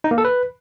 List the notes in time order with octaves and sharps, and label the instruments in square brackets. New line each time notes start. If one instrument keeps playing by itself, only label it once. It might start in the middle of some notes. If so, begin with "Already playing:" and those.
[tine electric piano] D#4
A#3
A4
B4